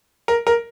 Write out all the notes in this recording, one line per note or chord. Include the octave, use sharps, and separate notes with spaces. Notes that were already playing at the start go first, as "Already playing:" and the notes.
A#4
A#4